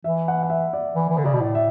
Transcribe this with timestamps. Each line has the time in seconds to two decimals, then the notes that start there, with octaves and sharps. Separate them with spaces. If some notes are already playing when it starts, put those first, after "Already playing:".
0.04 E3 E5
0.28 F#5
0.43 F#5
0.50 E5
0.73 D5
0.95 E3
1.09 E3
1.18 D3
1.25 C#3 D5
1.33 B2
1.41 A2
1.55 E5